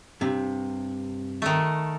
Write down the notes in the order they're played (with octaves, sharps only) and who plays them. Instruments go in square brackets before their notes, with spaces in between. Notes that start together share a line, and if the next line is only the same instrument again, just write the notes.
[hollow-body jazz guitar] G2 C3
[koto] D#3 A3